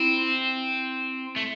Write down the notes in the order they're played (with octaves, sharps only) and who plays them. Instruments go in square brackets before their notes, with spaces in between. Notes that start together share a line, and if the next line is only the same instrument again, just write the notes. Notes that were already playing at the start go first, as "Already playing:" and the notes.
Already playing: [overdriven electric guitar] C4 [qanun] E4
[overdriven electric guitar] A3